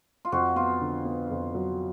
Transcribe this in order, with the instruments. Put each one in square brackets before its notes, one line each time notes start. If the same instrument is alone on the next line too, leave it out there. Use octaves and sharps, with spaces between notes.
[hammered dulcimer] F4
[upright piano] F2 [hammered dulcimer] F#4
[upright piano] B3 [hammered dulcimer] F4
[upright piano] D3
B3
F2
F#3